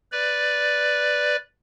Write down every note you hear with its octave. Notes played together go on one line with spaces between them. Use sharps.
B4 D5